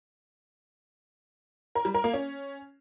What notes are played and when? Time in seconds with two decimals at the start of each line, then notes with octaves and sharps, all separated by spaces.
1.75 A#4
1.85 G3
1.94 A#4
2.04 A#3
2.14 C#4